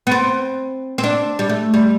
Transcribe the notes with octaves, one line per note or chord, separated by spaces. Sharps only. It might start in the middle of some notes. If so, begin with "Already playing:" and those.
B3
C4
C4
D4
G3
A3
G3